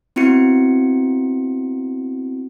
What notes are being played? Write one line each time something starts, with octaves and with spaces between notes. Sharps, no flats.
B3 C4 E4 F#4 C#7